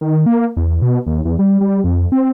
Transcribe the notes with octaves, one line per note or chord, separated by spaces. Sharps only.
D#3
A#3
E2
B2
D#2
E2
G3
G3
F2
C4